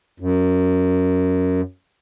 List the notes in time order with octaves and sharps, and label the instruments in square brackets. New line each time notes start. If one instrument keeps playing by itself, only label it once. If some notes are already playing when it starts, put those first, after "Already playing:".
[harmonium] F#2